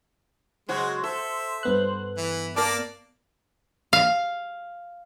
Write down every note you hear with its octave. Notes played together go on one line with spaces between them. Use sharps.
C#3 F#3 G#3 F#4 C5
A4 E5
G2 B3 F#6
E3
A#3 A#4 D5 A5 D6
F5